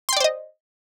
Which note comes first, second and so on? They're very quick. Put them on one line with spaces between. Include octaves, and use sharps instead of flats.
C6 G5 D5 C5 D#5